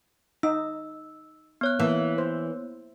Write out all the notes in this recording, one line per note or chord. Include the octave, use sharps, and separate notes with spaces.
D#4 E6
B3 C#5 F#6
E3 A#3
C5